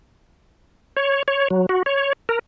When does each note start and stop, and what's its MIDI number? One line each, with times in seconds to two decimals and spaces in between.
0.97 1.23 73
1.28 1.48 73
1.50 1.66 54
1.69 1.83 66
1.86 2.13 73
2.29 2.39 70